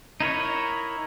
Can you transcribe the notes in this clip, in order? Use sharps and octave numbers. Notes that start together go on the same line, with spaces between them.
D#4 E4 A#4 C#5